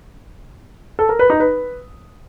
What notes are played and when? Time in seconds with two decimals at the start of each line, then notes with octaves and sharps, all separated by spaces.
0.99 A4
1.09 A#4
1.19 B4
1.30 D#4
1.40 B4